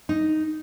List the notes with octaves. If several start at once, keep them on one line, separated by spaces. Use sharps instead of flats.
D#4